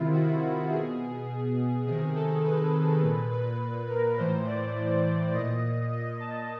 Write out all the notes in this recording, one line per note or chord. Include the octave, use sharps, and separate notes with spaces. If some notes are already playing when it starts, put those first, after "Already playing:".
Already playing: C3 D#3 E4 F4
F#4
B2 G#4
C3 D#3 G#4
A4
B4
A#2
B4
A#4
A2 E3 C5
D5
D5
A#2 D#5
D#5
A5